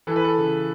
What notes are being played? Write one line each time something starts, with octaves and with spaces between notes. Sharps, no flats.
E3 A4
B4
A4
C#3